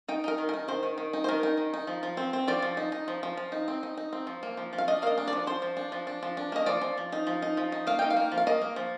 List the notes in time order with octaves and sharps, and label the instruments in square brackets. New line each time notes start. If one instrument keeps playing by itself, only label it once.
[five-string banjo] D#4 G5
D#4 A#4
D#3
A#4
D#4
D#3 C5
D#3
D#3
D#4
C5
D#3 A#4
D#4
D#3
D#4
F3
F3
C4
C4
F3 D5
F3
D#4
D#4
F3
F3
F3
D#4
C4
D#4
D#4
C4
F3
A#3
F3
F3
F5
D4 D#5
A#3 F5
D#5
D4
D5
F3
F3 C5
F3
D4
F3
D4
F3
D4
A#3 D#5
F3 D5
F3
F3
D#4
F3
D#4
F3
D#4
A#3 F5
D#4 G5
F5
A#3
F3
F5
A#3 D#5
A#3
F3